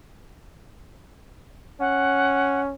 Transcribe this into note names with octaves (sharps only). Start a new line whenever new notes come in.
C#4 F#5